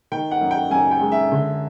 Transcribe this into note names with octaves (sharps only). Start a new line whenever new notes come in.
D#3 G5
F#5
F#2
G5
F#2 G#5
G5
G#3
E5
D3